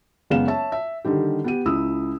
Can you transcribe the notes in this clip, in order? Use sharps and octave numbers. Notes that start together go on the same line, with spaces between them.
F#1 G#3 B3 F5 E7
C#5 E5 A5
E5
D3 D#3 G3 G4
B3 G4 D#7
C#2 E4 D#6 E6